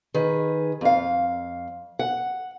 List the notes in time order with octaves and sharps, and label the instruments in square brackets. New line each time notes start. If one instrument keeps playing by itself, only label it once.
[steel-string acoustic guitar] D#3 G#4 B4
F2 F5
F#5